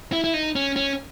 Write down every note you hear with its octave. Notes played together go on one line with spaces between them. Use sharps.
E4
E4
D#4
C#4
C#4